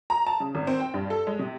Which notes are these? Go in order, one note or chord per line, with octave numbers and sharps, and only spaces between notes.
A#5
A5
C#3
G#1
C4
G5
G2
A4
G#3
C3